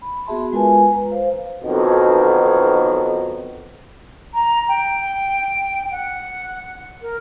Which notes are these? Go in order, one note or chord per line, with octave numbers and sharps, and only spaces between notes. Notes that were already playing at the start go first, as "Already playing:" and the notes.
B5
B3 F#4 G#4 E5 A5 C6
G#3 F4 A#4 B4 G#5
B4 A#5
C5 F5
B1 F2 B2 D#3 F#3
A#5
G5
F#5
A#4